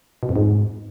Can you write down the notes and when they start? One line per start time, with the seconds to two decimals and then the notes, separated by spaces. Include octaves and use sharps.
0.23 B2
0.29 F2
0.36 G#2